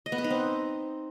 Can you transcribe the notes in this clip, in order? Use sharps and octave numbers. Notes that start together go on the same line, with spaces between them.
D#5
B3
B4
D#4
C4